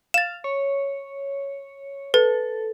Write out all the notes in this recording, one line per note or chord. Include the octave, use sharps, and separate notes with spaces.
F5 A6 E7
C#5
A4 B4